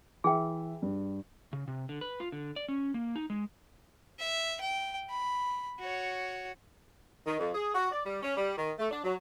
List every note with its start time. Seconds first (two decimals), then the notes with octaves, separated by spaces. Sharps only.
0.24 E3 G#4 E5 G5
0.82 G2
1.53 C#3
1.68 C3
1.89 D3
2.01 B4
2.20 F4
2.32 D3
2.56 D5
2.69 C#4
2.94 A#3
3.16 D#4
3.30 G#3
4.19 E5
4.61 G5
5.10 B5
5.79 F#4 C#5
7.27 D#3
7.39 F2
7.54 G#4
7.74 F#4
7.92 D5
8.05 G3
8.22 C#4
8.36 G3
8.57 D#3
8.79 A3
8.91 D4
9.04 F#3